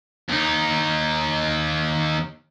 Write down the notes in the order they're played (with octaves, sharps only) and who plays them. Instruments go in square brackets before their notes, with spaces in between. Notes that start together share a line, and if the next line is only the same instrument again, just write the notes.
[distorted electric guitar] D#2 D#4